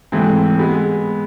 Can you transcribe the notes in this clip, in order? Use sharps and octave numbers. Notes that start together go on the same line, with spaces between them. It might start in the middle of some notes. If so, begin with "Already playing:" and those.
G#2 E3 A3 C4
G#3 B3